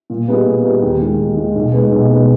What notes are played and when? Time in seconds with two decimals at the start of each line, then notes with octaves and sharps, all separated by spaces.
0.10 A#2
0.28 G3 B3 D#4 G#4
0.46 A#2
0.64 G3 B3 D#4 G#4
0.82 D#2
1.00 D#3 G#3
1.19 D#2
1.37 D#3 G#3
1.55 B1
1.73 B2 G#3 B3
1.92 B1
2.10 B2 G#3 B3